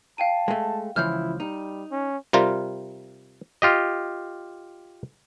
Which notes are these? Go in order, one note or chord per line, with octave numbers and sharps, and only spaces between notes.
F5 G5 A5 D#7
G#3 A3
C#2 E3 F3 E4 F6 G6
G3 D#4
C#4
C3 G3 F4 A#4
F4 G4 D#5